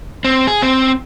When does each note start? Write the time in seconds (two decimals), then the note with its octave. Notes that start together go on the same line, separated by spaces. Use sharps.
0.24 C4
0.47 G#4
0.62 C4